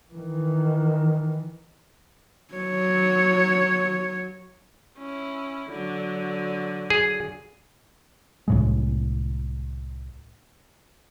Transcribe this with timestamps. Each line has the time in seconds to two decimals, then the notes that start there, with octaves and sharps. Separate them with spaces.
0.14 D#3 E3
2.54 F#3 C#5
4.97 C#4 E4
5.70 D3 F#3
6.90 G#4
8.48 C2 A2 G#3